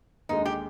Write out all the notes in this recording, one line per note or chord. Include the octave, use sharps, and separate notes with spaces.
D#2 D3 G#3 D#4
G4